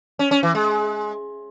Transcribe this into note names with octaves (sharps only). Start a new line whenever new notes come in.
C#4
C#4
E3
G#3